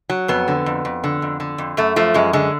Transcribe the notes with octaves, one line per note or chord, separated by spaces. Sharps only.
F#3
F2 B3
D3
F2
F2
D3
F2
D3
F2
F#2 A3
F3 A3
F#2 G#3
D3 G#3